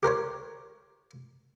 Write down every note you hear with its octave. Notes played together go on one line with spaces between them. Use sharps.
G4 A#4 C5 C#5